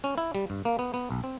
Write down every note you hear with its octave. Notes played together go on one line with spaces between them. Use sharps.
C#4
E4
G3
G2
A#3
B3
B3
B1
C4